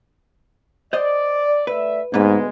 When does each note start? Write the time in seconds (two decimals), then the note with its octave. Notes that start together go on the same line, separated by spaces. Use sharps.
0.93 C5 D5 D#5
1.67 A3 B4 D5 E5
2.14 D2 G#2 G#3 A#3 B3 B4